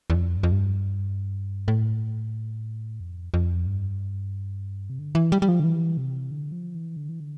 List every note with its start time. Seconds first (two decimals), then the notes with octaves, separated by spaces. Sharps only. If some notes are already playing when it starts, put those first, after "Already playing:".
0.10 E2
0.15 F2
0.37 G2
0.43 F2
0.52 G2
1.68 A2
3.00 F2
3.34 F2
3.67 G2
4.90 C3
4.99 D3
5.15 E3
5.32 G3
5.42 G3
5.49 F3
5.60 D3
5.64 E3
5.97 C3
6.31 D3
6.52 F3
6.75 E3
6.97 D3
7.09 E3
7.20 D3